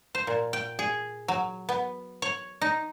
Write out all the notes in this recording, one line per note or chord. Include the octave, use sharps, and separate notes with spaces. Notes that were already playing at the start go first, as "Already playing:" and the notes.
C5
A#2
G5
G#4
F#3
B3
C#5
D#4